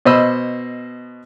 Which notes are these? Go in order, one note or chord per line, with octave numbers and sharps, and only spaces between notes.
B2 C5 D#5 B5 E6